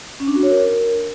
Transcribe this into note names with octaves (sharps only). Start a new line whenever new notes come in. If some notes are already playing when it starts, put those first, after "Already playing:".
C#4
D4
F#4
C#5
A#4